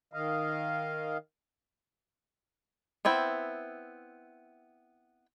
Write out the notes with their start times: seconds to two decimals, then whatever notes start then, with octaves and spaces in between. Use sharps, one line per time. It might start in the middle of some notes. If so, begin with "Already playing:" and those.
0.13 D#3 D#5 F5
3.05 B3 C4 E4 G5